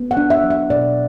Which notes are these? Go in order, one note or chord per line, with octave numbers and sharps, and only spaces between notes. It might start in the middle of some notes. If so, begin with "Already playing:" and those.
Already playing: B3
F#5
D4
E5
F#3
E5
B2 D5